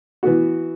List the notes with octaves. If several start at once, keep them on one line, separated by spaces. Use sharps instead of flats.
E3 B3 F#4